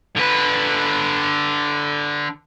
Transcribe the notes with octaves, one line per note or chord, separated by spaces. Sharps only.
D3 B4